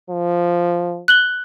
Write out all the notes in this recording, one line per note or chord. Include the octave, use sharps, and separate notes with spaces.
F3
F#6 F#7 G7